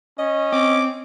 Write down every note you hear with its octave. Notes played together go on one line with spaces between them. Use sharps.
C#4 D#5
C4 D6